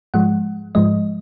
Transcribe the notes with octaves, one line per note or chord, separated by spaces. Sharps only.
G#2 F3 G#3 F#5
G#2 F3 G#3 D#5